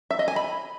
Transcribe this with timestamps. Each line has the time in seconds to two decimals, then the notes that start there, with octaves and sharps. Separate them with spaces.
0.10 E5
0.19 D#5
0.28 G#5
0.36 B5